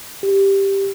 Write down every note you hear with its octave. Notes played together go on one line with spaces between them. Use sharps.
G4